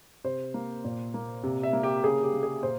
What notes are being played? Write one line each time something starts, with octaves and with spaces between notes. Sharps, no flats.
C3 C5
A#3
A#2
A#3
C3
E5
A#3
G4
C#3 G#4
G4
A#3
G#4
A#2 C5